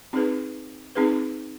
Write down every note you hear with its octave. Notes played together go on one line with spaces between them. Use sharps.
C4 D#4 G#4 B4
C4 D#4 G#4 B4